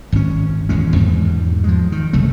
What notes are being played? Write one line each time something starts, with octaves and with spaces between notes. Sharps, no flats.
G#1 C#4
D#1 E2 G#3 C#4
E2 G#2 G3
F3 G#3
D#3
F#1 C2 F#2 A3